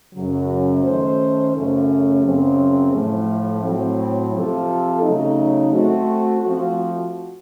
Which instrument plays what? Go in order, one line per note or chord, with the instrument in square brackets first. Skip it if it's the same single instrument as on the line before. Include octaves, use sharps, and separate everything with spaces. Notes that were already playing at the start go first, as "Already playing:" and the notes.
[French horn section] F#2 C#3 F#3
D#3 A3 C#4 A4 C5
F#2 C#3 A3 C#4
F#2 C#3 F#3 C4
A2 F3 A3
A2 F#3 C4
C3 F3 C4 F4 A4
C#3 F#3 A3 D#4
A3 C4 F#4
F3 A3 C4 F#4